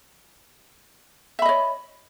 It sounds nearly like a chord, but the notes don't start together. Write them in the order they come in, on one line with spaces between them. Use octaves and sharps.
E5 B5 D#5 C#5